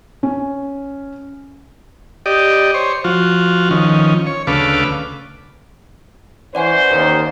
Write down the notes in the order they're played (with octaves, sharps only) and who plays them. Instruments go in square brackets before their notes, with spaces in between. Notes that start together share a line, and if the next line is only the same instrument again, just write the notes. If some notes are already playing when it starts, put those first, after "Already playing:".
[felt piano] C#4
[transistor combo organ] G4 D5 D#5
C5 C#5
F3 F4 F#4
D#3 F3 C#4
C#5
D2 C#3 A4 B4 F5 D6
[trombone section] E3 [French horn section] C#4 C5 [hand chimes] D5 F#5 G#5
[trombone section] D#2